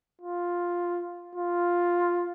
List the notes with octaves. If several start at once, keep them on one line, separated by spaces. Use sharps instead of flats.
F4
F4